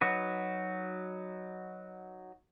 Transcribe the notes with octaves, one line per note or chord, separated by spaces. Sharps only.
F#3 D#4 F#4 B4